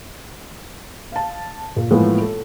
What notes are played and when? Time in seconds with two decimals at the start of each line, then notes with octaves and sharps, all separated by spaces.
1.12 F5 A5
1.76 A#2
1.90 A2 E3 F3 G#3 A#3 B3
2.22 A4